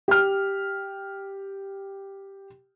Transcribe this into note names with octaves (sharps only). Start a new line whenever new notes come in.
G4 F6